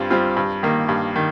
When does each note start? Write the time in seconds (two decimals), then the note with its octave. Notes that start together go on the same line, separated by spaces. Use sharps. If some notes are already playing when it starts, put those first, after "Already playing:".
Already playing: G2 G3 C4 F4
0.10 G3 C4 F4
0.36 G2
0.63 D#3 A#3
0.89 G2
1.16 D#3